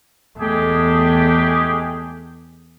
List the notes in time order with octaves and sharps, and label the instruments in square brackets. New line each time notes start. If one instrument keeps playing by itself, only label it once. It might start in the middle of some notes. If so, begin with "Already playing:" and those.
[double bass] E2 A3 [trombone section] G#3 G4 G#4